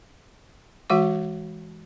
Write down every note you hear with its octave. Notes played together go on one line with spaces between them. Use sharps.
E3 G#3 F#4 F#5 D6